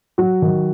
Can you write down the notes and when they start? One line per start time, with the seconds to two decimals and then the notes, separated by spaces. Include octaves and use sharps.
0.18 F#3 F#4
0.42 D#3